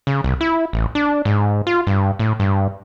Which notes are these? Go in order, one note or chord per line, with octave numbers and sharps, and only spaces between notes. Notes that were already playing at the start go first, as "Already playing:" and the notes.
C#3
C2
E4
A1
D4
G#2
F4
G2
A2
G2